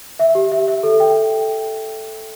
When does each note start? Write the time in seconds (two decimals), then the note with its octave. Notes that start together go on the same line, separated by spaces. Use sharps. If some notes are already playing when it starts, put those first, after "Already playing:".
0.19 E5
0.35 G4
0.52 E5
0.68 E5
0.83 A4
1.00 G5